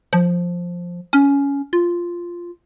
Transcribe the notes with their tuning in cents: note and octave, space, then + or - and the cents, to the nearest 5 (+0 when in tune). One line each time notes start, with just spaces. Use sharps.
F3 +5
C#4 +15
F4 -5